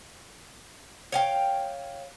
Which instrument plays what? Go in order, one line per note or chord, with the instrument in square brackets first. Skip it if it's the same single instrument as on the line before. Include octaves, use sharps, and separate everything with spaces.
[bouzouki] C#5 F5 G5